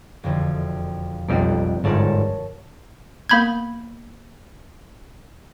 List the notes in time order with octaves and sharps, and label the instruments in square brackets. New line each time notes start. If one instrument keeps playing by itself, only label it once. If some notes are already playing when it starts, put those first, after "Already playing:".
[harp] E1 F2 D3
[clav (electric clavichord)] B1 F2 G3 [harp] D5 F#5
[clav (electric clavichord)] G1 G#2 D5 [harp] A#4 C#5 A5
[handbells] A#3 B3 B5 G6 G#6